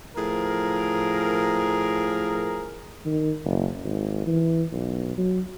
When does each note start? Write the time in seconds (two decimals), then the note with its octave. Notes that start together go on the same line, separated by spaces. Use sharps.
0.16 A2 F3 G#4 A#4
3.06 D#3
3.44 F#1
3.84 G#1
4.27 E3
4.72 B1
5.18 F#3